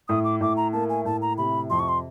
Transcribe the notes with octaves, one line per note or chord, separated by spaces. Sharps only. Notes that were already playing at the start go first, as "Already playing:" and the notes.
A2 D#6
D6
A2 D6
A#5
A#3 A5
G#5
A2 A5
A#5
C3 B5
F2 C6
C#6
C6